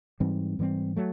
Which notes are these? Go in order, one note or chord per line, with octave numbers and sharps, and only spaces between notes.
G#2 E3 G3 C4
G#2 E3 G3 C4
F#3 A3